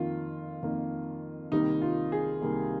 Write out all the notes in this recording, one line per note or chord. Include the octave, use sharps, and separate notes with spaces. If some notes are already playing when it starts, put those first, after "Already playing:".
Already playing: F2 D#3 A#3 F4
F2 D#3 A#3
C2 C3 D#3 G3 A#3 D#4
F4
G#4
C2 C3 D#3 G3 A#3